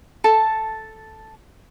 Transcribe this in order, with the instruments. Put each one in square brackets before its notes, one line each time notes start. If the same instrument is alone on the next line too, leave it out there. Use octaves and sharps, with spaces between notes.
[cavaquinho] A4 A5